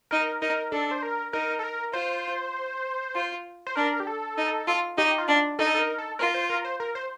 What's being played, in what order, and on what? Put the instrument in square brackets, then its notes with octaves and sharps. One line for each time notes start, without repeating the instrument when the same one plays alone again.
[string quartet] D#4 [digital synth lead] A#4
[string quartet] D#4 [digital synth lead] A#4
[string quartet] D4 [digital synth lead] A4
[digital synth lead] C5
A#4
[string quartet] D#4 [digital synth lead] A#4
[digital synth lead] A4
A#4
[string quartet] F4 [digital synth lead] C5
[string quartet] F4
[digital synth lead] C5
[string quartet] D4 [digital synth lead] A#4
[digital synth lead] G4
A4
[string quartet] D#4
F4
[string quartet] D#4 [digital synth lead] G4
[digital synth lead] F4
[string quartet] D4
[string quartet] D#4 [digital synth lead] A4
[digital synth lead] A4
A#4
A4
[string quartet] F4 [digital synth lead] A#4
[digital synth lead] C5
A#4
C5
A#4
C5